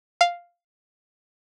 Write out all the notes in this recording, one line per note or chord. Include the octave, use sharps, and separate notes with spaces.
F5